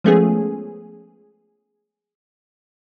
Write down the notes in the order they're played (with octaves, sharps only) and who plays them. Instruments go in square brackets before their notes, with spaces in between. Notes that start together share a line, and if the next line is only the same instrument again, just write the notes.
[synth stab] F3 G#3 A3 B3 C#4 G#4